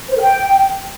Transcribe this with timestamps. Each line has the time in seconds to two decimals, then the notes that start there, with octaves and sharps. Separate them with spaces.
0.10 C5
0.15 A#4
0.21 G5